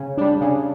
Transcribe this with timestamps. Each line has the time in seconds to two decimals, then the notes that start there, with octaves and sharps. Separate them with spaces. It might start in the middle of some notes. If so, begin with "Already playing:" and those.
Already playing: C#3
0.18 G3 D4
0.41 C#3